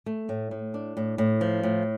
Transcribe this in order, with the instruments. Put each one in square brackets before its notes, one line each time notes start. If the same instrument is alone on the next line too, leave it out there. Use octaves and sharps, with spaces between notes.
[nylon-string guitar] A3
A2
A2
D4
A2
A2
F3
A2